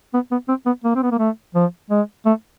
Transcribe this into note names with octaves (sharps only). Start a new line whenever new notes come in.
B3
B3
C4
B3
A#3
C4
B3
A#3
A3
F3
G#3
A3